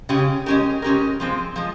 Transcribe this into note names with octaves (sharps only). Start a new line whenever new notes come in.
C#3 G#3 C#4 G4
G#3 C#4 G4 A#4
G#3 C#4 G4 A#4
F3 G#3 C4
F3 G#3